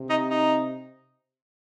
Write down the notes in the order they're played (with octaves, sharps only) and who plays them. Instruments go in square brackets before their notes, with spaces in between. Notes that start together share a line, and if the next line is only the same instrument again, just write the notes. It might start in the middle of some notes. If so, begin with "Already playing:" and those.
Already playing: [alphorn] C3
[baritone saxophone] D#4
D#4